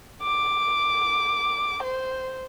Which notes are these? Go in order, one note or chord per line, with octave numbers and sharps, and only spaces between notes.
D6
C5